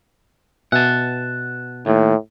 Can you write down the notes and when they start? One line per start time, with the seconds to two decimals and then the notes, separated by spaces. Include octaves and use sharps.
0.72 B2 E5 F#5 G#5 A5
1.86 D#2 A2